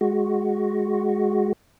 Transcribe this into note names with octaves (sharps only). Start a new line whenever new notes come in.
G#3 F#4